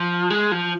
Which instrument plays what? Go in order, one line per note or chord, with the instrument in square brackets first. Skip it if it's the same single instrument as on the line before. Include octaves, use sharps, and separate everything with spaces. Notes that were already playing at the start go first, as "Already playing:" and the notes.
Already playing: [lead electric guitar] F3
G#3
F3